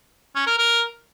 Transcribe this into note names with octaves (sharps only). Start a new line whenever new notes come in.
C#4
A#4
A#4